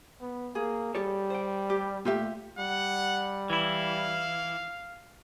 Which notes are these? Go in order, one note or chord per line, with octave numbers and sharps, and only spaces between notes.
B3
A#3 G#4
G3 G4 A4 C#5
C5 G5
G4
A#2 A3 F4 G4 E5
G3 F#5
E3 E4 F5